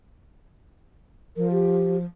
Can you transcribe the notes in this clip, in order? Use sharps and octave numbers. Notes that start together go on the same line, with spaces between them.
F3 A#4
G4